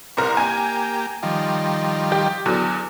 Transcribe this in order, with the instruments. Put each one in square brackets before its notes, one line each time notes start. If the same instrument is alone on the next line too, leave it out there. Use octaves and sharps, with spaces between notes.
[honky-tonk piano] C2 A#4 [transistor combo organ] C4
[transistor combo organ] A#3 G4 [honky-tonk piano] G#5
[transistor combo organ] D#3 F3 G3
[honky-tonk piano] G4
E2 D3 F#3